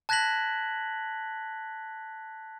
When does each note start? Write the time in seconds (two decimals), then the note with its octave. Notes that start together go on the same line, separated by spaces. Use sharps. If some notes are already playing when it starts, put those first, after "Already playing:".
0.09 A5 F#6 G#6 A#6 B6 F#7